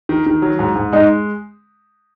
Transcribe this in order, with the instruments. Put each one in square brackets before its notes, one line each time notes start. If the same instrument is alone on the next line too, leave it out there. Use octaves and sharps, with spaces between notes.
[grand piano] D#3
D#3
F#3
G#2
G#2
[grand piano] G#3 [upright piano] D#4